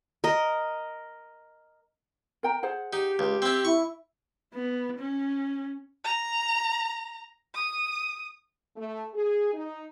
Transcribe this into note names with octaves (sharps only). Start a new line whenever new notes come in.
A#4 D#5
A#4 G5 A#5
G#4 C5 F#5
D#4 G4
C#2
C4 E4
E4 C#6
B3
C#4
A#5
D#6
A3
G#4
D#4